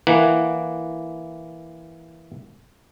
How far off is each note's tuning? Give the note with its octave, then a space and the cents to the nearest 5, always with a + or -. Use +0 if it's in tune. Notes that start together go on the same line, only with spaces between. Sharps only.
E3 +0 A#3 +0 F#5 +0